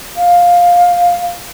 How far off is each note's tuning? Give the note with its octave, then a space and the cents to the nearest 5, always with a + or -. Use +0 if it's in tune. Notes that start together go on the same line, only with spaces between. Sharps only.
F5 +10